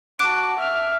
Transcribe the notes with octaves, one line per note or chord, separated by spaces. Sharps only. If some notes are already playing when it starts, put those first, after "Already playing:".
F#4 A5 D6 F#6 D7
E5 F6